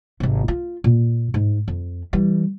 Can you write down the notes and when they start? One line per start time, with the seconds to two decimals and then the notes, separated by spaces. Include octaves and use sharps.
0.20 G#1 C3
0.48 F4
0.84 A#2
1.34 G#2
1.68 F2
2.13 E3 G3